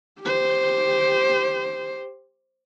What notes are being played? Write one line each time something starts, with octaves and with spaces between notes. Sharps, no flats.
G4 C5